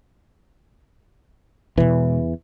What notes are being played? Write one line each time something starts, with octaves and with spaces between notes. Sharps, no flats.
E2 B2 E3 G#3